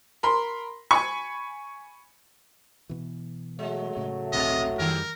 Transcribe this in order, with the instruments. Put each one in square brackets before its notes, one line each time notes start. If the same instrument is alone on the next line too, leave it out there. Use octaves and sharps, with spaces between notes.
[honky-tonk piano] A#4 B5 C6
G#5 B5 C#6
[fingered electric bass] B2 E3
[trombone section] F#3 A3 [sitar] G#3
[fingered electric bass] A2 C#3
[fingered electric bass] D#1 A#1 [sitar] B2 [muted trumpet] D#5
[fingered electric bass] F#2 G3 [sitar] D#3 G4 [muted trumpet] A#4